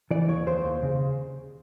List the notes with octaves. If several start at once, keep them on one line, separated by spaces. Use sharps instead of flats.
E3 D5
D#2 C#5
D#2 C5
D#2
C#3